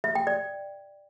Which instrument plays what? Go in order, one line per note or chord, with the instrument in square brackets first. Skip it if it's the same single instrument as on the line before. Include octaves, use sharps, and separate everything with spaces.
[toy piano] E5
G5
D5